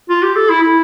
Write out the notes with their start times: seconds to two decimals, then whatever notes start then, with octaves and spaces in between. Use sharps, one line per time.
0.10 F4
0.23 G4
0.36 A4
0.50 E4
0.63 E4